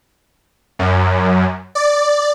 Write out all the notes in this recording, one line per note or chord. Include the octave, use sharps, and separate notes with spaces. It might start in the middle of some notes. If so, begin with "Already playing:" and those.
F#2
D5